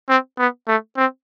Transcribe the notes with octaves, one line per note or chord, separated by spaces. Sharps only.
C4
B3
A3
C4